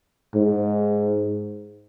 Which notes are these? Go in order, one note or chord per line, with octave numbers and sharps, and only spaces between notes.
G#2